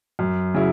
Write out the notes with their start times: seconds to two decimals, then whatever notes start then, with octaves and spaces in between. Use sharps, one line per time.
0.19 F#2
0.54 C#3 F#3 E4